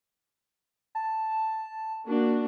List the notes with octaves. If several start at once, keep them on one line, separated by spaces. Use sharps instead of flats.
A5
A#3 D4 F#4